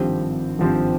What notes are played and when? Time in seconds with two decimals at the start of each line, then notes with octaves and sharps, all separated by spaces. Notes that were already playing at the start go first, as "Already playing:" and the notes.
Already playing: G#1 G2 F3 C4 G4
0.59 G#1 G2 F3 C4 G4